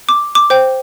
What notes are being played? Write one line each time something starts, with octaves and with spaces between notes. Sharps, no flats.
D6
D6
C5 G5